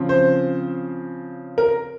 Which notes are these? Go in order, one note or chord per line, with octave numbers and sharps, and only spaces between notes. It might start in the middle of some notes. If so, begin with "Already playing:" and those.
Already playing: C#3 F3 C4
C5
A#4